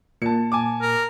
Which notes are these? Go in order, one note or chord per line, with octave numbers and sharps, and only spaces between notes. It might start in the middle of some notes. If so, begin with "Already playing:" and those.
A#2 A5 C#7
G#5 A5 D6
A#4